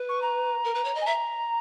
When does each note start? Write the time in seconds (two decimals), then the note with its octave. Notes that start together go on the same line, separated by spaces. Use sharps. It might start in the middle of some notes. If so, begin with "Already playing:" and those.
Already playing: B4
0.09 C#6
0.22 A#5
0.64 A#4
0.75 B4
0.85 C#5
0.95 D#5
1.01 G#5
1.06 E5 A#5